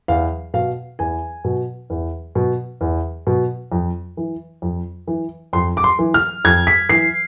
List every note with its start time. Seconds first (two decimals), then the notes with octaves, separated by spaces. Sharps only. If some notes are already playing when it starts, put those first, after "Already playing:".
0.08 E2 F5
0.54 B2 F5
0.99 E2 G#5
1.44 B2
1.90 E2
2.35 B2
2.81 E2
3.27 B2
3.72 F2
4.17 E3
4.62 F2
5.07 E3
5.53 F2 C6
5.77 D6
5.84 C6
5.99 E3
6.14 F6
6.45 F2 G#6
6.67 B6
6.89 E3 C7